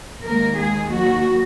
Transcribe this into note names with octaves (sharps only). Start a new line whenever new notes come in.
D#2 D#3 G#3 A#3 A#4
G#3 G#4
F#3 F#4